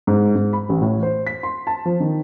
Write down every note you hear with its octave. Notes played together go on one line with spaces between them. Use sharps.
G#2
G#2
B5
A1
A2
C5
B6
C6
A5
F3
D#3